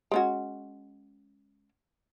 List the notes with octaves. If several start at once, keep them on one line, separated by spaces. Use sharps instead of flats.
G#3 C#4 F#4